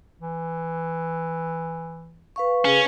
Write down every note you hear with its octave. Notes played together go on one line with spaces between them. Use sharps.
E3
B4 F5 C#6
C#3 C#4